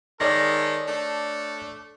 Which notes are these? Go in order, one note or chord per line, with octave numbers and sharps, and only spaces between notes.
D#3 G#3 A4 C#5 D5 A#6
A3 D4